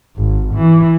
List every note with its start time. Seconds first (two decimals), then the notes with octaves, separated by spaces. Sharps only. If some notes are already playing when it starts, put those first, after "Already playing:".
0.17 G#1
0.55 E3